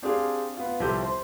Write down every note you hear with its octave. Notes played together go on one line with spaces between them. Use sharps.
C4 D4 G4 G#4 F5
B3 F4
C2 F3 G4 A4 C5 G6
C5